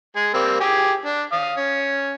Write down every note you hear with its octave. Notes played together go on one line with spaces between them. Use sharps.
G#3 G#4
G3 A#3 C4
G4 G#4 G#5
D4
F5 D#6
C#4